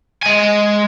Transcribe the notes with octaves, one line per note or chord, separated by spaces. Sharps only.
G#3 G#5